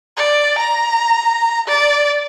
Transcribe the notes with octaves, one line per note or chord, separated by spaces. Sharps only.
D5
A#5
D5